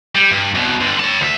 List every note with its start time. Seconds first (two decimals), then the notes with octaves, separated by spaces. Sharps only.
0.15 G3
0.32 G2
0.55 C2 B2
0.81 G2 D3
1.00 C#5 A5
1.21 D2 E5